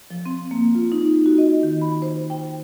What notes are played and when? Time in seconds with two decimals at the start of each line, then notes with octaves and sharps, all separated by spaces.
0.11 F3
0.26 C4
0.51 A#3
0.75 F4
0.92 D#4
1.26 F#4
1.38 D#5
1.63 D#3
1.81 B5
2.02 C5
2.30 G5